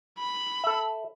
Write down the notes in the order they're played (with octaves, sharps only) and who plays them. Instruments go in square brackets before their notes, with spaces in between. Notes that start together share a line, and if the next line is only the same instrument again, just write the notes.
[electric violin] B5
[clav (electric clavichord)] A4 E5